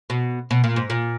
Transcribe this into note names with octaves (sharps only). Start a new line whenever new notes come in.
B2
B2
A#2
G#2
A#2